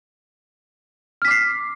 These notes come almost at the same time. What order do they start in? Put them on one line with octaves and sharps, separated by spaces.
F6 B6 D6 C7